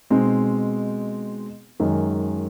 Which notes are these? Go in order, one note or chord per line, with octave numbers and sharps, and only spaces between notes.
B2 G#3 C4 D#4
F#2 D#3 G#3